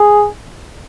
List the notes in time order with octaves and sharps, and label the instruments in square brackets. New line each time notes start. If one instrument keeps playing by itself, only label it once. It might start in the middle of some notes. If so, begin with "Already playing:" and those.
Already playing: [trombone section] G#4